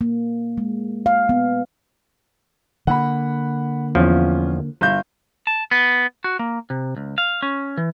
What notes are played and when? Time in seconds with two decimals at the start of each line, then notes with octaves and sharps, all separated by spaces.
0.01 A#3
0.58 G#3
1.06 F5
1.29 B3
2.87 D3 A#3 F#5 B5
3.95 E2 F3 C#4 F4
4.81 G1 F5 G6
5.47 A5
5.71 B3
6.24 F#4
6.39 A#3
6.70 C3
6.97 C#2
7.18 F5
7.42 C#4
7.78 E3